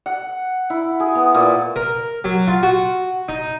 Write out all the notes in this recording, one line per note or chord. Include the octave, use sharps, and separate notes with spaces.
F#5
E4
G#4
B3
A#2
A#4
F#3
F4
F#4
D#4